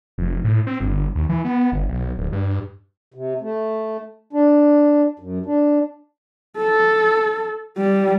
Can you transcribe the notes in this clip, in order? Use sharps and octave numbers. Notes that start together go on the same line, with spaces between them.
F1
A2
C4
G1
D#2
E3
B3
G1
B1
D1
G2
C3
A3
D4
F#2
D4
A4
G3